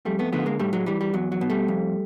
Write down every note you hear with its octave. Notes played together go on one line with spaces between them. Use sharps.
F2 G3 A3
A3 B3
D3 F3 A3 B3
G#3 A#3
A2 G3 A3
F#3 G#3
E3 G3
G3
E2 F#3
F#3
B2
G3 A3
F2